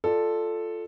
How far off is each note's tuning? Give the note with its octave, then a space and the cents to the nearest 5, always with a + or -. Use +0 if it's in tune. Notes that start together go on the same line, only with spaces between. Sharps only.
F4 +0 A4 +0 D5 +25